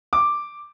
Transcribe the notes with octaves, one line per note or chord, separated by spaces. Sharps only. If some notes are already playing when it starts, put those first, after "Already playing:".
D6